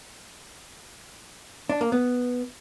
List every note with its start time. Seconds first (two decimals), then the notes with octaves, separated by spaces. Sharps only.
1.70 D4
1.81 A#3
1.92 B3